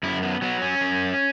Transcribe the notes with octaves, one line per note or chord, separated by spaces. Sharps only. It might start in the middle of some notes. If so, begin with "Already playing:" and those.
F#2 E4
B3
F#3 B3
C#4
F#2